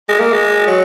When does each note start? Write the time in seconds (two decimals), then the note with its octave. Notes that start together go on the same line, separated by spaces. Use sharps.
0.09 G#3
0.20 A#3
0.32 G#3
0.67 F#3